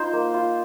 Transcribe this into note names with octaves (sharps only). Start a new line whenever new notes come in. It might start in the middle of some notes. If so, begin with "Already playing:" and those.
Already playing: D#4 F4 C5
A#3
F4